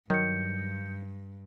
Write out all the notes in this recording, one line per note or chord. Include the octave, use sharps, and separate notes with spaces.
G2 D#3 F#3 G6 C#7